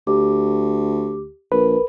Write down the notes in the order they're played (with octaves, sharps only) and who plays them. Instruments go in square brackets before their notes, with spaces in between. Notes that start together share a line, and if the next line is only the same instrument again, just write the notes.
[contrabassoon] D2 [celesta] G4 D6
[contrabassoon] A#1 [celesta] A#4 [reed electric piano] B4